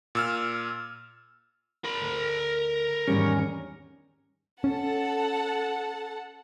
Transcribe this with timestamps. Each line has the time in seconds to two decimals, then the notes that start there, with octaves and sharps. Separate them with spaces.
0.15 A#2 E6 F6
1.84 A#4 B5
2.02 D2
3.08 E2 G#2 D#3 G3 C#4 D5
4.64 C#4 A4 F#5 A5